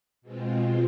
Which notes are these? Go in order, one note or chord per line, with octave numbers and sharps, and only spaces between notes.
B2 G#3 C4 F4